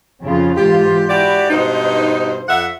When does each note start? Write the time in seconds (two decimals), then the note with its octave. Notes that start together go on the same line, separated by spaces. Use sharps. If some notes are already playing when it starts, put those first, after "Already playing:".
0.20 F2 C#3 F4
0.57 G#2 E3 F4 G4
1.10 E4 F#4 G4 D5
1.50 G2 B2 D#4 C5
2.48 F2 E5 F#5